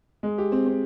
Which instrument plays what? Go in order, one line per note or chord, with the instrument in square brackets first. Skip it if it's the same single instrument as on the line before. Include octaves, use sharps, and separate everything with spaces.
[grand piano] G#3
G4
C4
C4